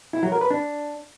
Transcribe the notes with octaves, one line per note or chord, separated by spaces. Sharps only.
E4
F#3
A#4
B4
D4